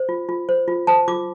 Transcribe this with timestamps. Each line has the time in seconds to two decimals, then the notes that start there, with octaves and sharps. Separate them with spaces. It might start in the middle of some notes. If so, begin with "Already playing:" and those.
Already playing: C5
0.09 F4
0.29 F4
0.49 C5
0.68 F4
0.87 C5 A5
1.08 F4 D6